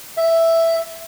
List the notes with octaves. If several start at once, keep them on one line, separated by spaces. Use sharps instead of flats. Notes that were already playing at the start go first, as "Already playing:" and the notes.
E5